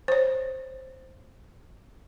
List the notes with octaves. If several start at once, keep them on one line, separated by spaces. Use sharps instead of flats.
C5 C#5